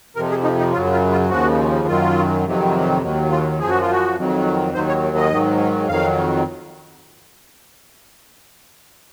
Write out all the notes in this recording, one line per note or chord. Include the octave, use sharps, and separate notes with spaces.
F2 C3 F3 A#4
G#4
D#4
D#4
F#2 C#3 F#3 F4
F4
F4
D#2 C#3 F3 F#4
F#2 D#3 F#3 F4
F2 C3 D#3 F#3
D#2 D#3 F#3
F4
F#2 F3 G#4
F#4
F4
F#4
F2 D#3 F#3
D#2 D#3 F#3 C5
C#5
D#5
G#2 D#3 F#3
F2 D#3 F#3 F5